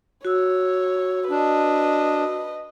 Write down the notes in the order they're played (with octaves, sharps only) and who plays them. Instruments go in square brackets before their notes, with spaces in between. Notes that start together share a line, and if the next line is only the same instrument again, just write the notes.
[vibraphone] F#4 E6 [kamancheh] C#5
[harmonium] D4 [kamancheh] B4 D#5